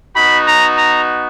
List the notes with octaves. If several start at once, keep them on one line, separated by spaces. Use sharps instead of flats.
B3 D#4 F#4 B5
A#5
A#5